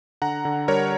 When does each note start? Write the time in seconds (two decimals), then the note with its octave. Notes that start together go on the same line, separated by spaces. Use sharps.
0.22 D3 F#5 A#5
0.45 D3
0.68 G3 A#4 C#5